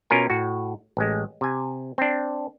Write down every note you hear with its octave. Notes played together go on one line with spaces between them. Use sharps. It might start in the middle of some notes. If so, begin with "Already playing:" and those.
B2 C#4 F4 A#4 G#5
A2 F#4
A1 G#3
C3 G#5
C4 D4